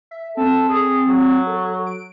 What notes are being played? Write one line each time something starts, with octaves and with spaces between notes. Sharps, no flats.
E5
C4 A4
G#4
F#3
A4
D7